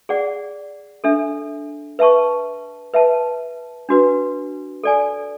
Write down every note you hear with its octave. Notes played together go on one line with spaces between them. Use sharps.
G#4 D5 F#5
D4 A4 E5
B4 E5 A5 C#6
B4 E5 A5
D4 F#4 B4
A4 D5 G#5